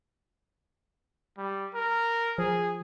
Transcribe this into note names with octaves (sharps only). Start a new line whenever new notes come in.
G3
A#4
F3 G#4